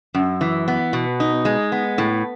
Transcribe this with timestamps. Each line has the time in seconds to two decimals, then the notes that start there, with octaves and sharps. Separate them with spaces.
0.15 F#2
0.41 E3
0.68 B3
0.93 B2
1.20 D#4
1.45 G#3
1.72 B3
1.98 A2